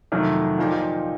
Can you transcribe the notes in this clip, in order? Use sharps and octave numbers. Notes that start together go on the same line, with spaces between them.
F2 C3 D#3 F#3 A3
A#2 F3 A#3 D#4 G4